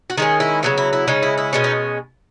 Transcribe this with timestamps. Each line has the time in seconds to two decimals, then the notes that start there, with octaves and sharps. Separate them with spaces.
0.10 F#4
0.18 D#3 G#3 C#4 G#4
0.40 E4
0.63 C#3 F#3 B3 E4
0.78 E4
0.93 E4
1.08 C#3 G#3 C#4 D#4
1.23 E4
1.38 E4
1.53 B2 G#3 C#4
1.64 D#4